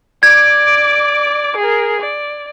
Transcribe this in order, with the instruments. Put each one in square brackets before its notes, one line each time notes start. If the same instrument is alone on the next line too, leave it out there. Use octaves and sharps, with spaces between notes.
[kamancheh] D5 D6 [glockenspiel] G#6
[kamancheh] G#4 A#4
D5